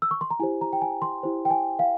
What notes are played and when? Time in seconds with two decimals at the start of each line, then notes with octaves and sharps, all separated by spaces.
0.02 E6
0.11 C#6
0.21 C6
0.30 A#5
0.40 E4 G4 C5 G#5
0.61 A#5
0.73 G5
0.82 G#5
1.02 C6
1.23 E4 G4 C5
1.45 G5
1.50 G#5
1.79 F5